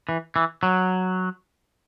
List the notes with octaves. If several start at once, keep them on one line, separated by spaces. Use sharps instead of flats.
E3
E3
F#3